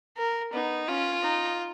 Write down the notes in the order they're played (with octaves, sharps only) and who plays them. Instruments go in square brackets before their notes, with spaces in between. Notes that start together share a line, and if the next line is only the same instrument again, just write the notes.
[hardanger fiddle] A#4
[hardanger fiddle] B3 [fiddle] D#4
[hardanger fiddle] C#4 [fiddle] F4
[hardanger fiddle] D#4